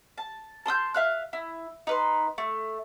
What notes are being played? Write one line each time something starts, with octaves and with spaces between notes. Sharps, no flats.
A5
A5 C6 D#6 G6
E5 F5 F#6
E4
D#4 B4 C6
A3